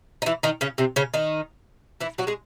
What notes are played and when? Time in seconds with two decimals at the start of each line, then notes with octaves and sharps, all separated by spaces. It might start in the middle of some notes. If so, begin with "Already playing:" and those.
0.22 D#4
0.26 E3 E4
0.43 D#3 D#4
0.61 C#3 C#4
0.78 C3 C4
0.96 C#3 C#4
1.14 D#3 D#4
2.01 E3 E4
2.18 F#3 F#4
2.27 G#3 G#4